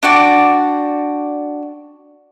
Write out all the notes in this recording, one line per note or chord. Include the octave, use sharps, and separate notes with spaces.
D4 F#4 D5 G5